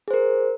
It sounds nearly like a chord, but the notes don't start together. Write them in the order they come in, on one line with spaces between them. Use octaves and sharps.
G#4 C5 A#4